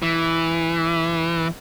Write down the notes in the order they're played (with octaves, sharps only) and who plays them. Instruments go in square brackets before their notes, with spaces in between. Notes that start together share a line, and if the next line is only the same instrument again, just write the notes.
[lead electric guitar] E3